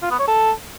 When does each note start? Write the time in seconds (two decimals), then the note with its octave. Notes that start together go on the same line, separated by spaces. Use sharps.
0.02 F4
0.11 B3
0.19 C#5
0.28 A4